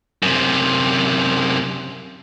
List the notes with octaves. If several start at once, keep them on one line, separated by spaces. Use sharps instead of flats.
F#2 C3